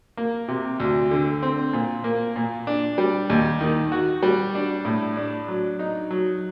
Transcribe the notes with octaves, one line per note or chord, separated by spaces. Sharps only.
A#3
C3
D2
D3
C4
A#2
A#3
A#2
D4
G3
D#2
D#3
F#4
G3
D4
A2
D4
F#3
D#4
F#3